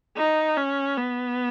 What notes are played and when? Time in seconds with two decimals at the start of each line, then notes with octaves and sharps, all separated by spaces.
0.17 D#4
0.57 C#4
0.97 B3